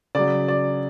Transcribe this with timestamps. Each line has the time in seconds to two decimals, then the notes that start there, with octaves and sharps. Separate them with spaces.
0.15 C#3 F#3 D5
0.48 D5